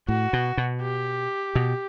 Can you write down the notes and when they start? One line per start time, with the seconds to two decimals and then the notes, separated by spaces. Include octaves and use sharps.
0.08 A2 F#4
0.33 B2
0.58 B2
0.82 G4
1.55 B2